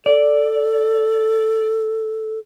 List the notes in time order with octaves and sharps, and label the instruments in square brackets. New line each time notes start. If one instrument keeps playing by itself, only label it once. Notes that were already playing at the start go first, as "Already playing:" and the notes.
[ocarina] A4 [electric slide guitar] D5